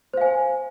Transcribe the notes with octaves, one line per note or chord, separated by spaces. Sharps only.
C5 F5 G#5